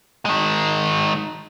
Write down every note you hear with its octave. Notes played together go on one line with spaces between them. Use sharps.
D#3 G#3